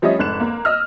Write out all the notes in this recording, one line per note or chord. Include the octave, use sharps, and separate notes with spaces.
F3 G3 A3 C#4 D#5
F1 G#2 F#6 E7
A#3
D#5 E6 F6